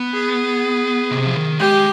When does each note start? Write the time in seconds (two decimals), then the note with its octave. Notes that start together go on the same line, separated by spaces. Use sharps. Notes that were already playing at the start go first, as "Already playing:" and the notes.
Already playing: B3
0.13 G#4
1.11 C3
1.26 F3
1.35 D#3
1.60 G#3 G4